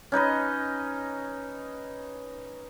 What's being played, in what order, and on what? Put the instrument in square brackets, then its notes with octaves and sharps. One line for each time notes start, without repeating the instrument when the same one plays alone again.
[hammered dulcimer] C#4 D#4 B4 D#5